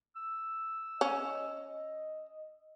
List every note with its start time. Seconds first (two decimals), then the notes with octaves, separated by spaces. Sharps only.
0.16 E6
1.01 C#4 D#5